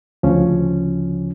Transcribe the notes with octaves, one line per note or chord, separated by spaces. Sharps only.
D2 C#3 F3 C#4